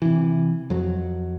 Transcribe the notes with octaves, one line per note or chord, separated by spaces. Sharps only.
C3 E3
F2 F#3